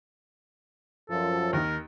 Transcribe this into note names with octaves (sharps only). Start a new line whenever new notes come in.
F#2 F3 A4
D#2 D#4 A#4